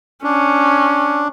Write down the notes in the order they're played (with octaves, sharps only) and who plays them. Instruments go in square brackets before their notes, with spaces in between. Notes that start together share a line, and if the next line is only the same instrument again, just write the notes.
[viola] C#4 [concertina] D4